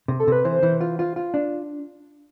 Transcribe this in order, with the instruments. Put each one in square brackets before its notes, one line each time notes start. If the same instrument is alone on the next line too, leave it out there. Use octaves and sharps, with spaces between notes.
[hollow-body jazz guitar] C3
[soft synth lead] A4
[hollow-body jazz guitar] C3 [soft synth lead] B4
[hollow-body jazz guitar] E3 [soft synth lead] C5
[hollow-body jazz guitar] E3
F4
F4
F4
D4